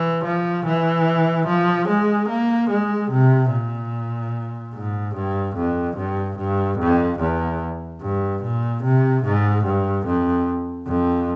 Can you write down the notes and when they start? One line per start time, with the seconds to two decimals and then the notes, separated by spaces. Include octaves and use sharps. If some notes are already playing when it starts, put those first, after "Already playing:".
Already playing: E3
0.24 F3
0.65 E3
1.47 F3
1.88 G#3
2.29 A#3
2.70 G#3
3.11 C3
3.52 A#2
4.74 G#2
5.15 G2
5.56 F2
5.97 G2
6.38 G2
6.78 F2
7.20 E2
8.01 G2
8.42 A#2
8.83 C3
9.24 G#2
9.65 G2
10.06 F2
10.87 F2